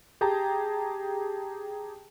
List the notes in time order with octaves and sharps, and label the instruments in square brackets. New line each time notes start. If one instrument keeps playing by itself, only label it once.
[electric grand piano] G4 G#4 G5 A5 A#5